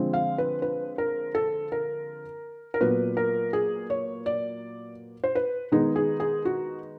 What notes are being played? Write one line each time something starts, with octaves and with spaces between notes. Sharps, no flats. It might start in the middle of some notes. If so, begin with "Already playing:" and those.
Already playing: D3 F3 G#3 C4
F5
B4
B4
A#4
A4
A#4
A#4
A#2 F#3 B3 B4
A#4
G#4
C#5
D5
C5
B4
D#3 G#3 B3 D#4 G#4
G#4
G#4
F#4